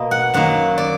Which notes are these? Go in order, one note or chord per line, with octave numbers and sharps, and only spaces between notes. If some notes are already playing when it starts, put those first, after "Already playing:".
Already playing: B2 A#3 D#5
F#5
F#2 D#3 F#3 A#3 F#5
D5